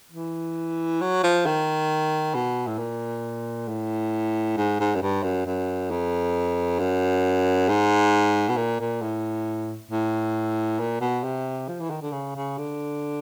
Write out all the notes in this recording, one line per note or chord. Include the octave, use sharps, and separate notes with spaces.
E3
F#3
F3
D#3
B2
A2
A#2
A2
G#2
G#2
F#2
G2
F#2
F#2
F2
F#2
G#2
B2
A#2
A#2
A2
A2
A#2
B2
C3
F3
E3
D#3
D3
C#3
C#3
D3